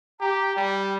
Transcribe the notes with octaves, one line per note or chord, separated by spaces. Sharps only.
G4 A#5
G3 G5